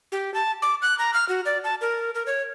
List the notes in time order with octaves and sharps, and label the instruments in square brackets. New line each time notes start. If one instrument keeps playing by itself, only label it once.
[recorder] G4
A5
D6
F#6
A#5
F6
F#4
D5
A5
A#4
A#4
C#5